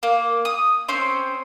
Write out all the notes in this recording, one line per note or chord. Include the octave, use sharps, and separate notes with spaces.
A#3
D#6
C4 C#4 C5